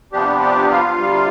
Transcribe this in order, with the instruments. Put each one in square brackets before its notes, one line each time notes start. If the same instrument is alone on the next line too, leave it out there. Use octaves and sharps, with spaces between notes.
[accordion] C3 F3 B3 D4 G4
G4
F4 F5
D2 C3 G3